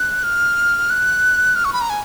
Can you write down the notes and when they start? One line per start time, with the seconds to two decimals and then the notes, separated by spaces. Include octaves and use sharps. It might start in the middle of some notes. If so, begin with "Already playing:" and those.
Already playing: F#6
0.24 F6
0.90 F#6
1.56 F6
1.65 C#6
1.73 B5
1.81 A#5
1.90 G#5